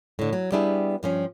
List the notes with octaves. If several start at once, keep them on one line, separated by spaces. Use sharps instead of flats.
A2 D3
F#3
G3 B3 D4 E4 G#4
G2 F3 C#4